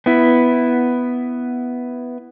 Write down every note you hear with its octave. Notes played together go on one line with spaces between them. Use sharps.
B3 E4